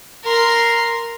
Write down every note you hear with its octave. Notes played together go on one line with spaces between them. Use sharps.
A#4 C6